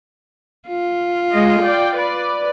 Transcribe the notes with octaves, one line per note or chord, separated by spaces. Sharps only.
F4
G#3 D#5
D5 G5
B4 D5